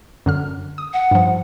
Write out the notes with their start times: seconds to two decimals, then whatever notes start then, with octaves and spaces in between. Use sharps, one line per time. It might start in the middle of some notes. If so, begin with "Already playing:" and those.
0.26 F#2 D3 F6
0.78 D#6
0.93 F#5
1.11 G2 F3